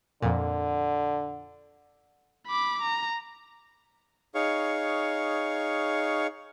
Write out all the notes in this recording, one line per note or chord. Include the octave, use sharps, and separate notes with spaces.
F2 A#2 D3
B5 D6
A#5
D#4 G#4 C#5 F5 C#6